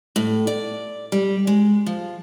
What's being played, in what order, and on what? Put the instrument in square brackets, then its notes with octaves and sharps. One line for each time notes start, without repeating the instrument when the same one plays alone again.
[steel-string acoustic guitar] A2
D5
G3
G#3
F3